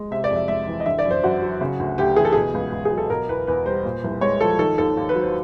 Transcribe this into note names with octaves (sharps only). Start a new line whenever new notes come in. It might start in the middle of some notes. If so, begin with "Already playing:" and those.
Already playing: G#3
C3 E5
D5
F2
E5
G#3 E5
E3
D#5
D3 E5
D5
F#2
C5
F#2 F#4
F#3
C#3
D2
D2 G4
E3 G#4
A4
B2 G#4
C#2
C#2
G#4
F#3
A4
B2 A#4
E2 B4
E2 B4
G3 C5
A#2
C2
G#3 C#5
F3 A4
D#3 A4
D#2 A4
D#2
B4
F#3
C5